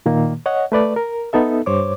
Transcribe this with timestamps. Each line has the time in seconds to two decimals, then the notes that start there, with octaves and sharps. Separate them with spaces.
0.06 A#2 D#3 A#3
0.46 C#5 D#5 F#5
0.72 A3 B4 D5
0.96 A#4
1.33 B3 D#4 A4 E5
1.66 G2 C5 C#5 D6